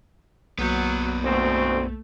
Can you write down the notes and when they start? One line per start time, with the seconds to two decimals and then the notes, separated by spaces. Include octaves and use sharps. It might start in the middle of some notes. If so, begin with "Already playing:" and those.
0.59 B1 F#2 F#3 A#3 B3 G6
1.23 D2 B2 A3 C4